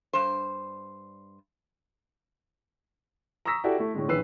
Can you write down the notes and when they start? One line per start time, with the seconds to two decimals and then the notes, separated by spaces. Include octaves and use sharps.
0.13 G2 C5
3.45 A#5 C#6 D#6 E6 A#6 B6
3.64 E4 F#4 G4 A4 D5
3.78 A3 E4
3.94 A2 D3 G#3
4.08 A#1 D#3 E3 B4 E6 C7